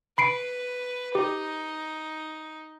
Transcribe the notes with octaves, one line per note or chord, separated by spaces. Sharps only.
B4 B5 C7 D7
D#4 G4